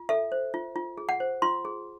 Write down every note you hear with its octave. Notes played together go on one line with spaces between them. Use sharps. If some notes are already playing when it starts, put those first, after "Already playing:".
Already playing: F4
A4 E5
C5
F4
F4
G#4
F#5
C5
F4 C6
G#4